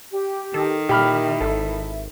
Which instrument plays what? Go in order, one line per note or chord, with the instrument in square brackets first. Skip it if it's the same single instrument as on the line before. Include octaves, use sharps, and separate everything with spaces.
[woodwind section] G4
[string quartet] D#3 [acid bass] A4
[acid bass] A#2 [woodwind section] E4 E5 [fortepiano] G4 B5 F6
[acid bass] G#1 [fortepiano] A4